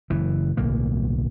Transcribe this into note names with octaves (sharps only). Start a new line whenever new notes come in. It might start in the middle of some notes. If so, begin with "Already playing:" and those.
F#1 E3
D1 B1 A#3